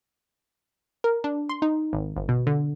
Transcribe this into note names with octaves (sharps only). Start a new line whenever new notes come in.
A#4
D4
C6
D#4
G#1
G1
B2
D3